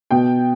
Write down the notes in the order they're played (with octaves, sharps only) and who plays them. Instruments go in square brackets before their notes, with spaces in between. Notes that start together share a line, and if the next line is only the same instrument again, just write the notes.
[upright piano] B2 G5